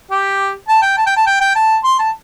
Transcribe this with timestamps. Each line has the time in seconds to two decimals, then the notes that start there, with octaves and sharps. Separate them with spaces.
0.11 G4
0.68 A5
0.82 G5
0.97 A5
1.06 G5
1.17 A5
1.27 G5
1.40 G5
1.56 A5
1.84 C6
1.99 A5